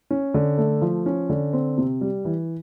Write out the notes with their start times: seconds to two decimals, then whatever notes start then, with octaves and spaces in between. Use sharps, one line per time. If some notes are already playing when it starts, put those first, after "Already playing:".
0.10 C#4
0.34 D3
0.58 A3
0.81 F3
1.06 C#4
1.29 D3
1.53 C4
1.78 C3
2.01 G3
2.25 E3